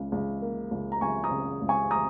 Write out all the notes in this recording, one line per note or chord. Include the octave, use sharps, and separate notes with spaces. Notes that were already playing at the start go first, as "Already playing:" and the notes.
Already playing: C#2 C#3
C#2
A#3
C#2
A#5
C#2 G#5 C#6
A#5 D#6
C#3
C#2
G#5 C#6
A#5 D#6